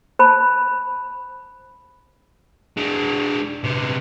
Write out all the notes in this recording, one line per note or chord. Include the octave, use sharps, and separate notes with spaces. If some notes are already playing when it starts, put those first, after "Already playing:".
C5 A5 B5
G#3 D4
C3 B3